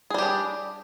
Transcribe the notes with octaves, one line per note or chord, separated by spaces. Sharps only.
G3 D4 G4 G#4